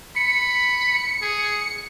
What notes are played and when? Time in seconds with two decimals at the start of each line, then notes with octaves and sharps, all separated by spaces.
0.16 B5 C#7
1.22 G#4